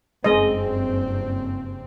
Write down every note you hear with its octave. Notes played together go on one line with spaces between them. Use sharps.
F#1 G2 G#3 C4 D#5